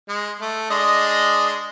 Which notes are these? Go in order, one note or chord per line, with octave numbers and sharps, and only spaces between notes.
G#3
A3
G#3 D4 D#5